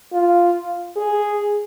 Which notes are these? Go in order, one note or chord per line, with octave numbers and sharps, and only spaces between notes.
F4
G#4